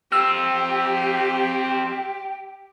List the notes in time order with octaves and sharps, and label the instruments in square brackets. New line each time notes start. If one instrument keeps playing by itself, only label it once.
[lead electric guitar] C4 F4 [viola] G4 [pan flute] G5 [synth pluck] E6